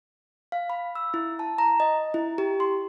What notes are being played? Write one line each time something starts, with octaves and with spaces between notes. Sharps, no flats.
F5
B5
E6
E4
A5
A#5
D#5
E4
G4
C6